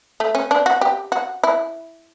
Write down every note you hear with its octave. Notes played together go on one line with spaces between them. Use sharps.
A3
C#4
D4
F#4
G4
F#4
E4